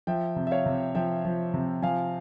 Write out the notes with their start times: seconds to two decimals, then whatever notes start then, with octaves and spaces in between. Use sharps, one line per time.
0.07 F3 E5 G5
0.36 C3
0.47 E5
0.51 C#5 F5
0.66 C3
0.95 F3 E5 G5
1.25 F3
1.54 C3
1.83 F3 F5 G#5